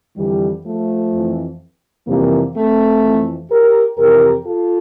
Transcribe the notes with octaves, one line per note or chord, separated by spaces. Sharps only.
F2 D3 E3 G3
F3 A3
F2 E3
F2 C3 E3 G3 A#3
A3 C4
F2 E3
G4 A#4
F2 C3 E3 G4 A#4
F4 A4